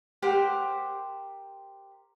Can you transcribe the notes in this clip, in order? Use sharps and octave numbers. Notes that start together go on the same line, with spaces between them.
G4 A#4 C5 F#5